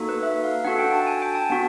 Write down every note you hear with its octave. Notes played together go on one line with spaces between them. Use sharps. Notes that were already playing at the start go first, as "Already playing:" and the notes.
Already playing: A#3 D#4 F#4 A4
B4
E5
F5
D4 F#4 A4 F#5
G5
A5
G#5
G5
A5
B3 D4 F#4